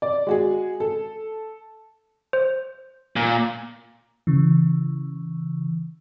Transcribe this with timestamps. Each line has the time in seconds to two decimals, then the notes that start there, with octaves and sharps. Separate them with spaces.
0.02 D5
0.27 G#3 F#4 G#4
0.80 A4
2.33 C5
3.16 A#2
4.27 C#3 E3